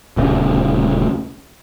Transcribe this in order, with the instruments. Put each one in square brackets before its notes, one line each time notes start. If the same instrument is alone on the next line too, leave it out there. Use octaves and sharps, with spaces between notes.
[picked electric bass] D#1 D2 C#3